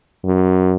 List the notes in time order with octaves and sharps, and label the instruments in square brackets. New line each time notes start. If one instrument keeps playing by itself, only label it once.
[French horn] F#2